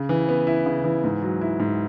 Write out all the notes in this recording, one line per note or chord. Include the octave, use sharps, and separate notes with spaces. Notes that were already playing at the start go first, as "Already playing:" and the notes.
Already playing: C#3
E3
B3
E4
C#3
E3
G#2
F#3
E4
G#2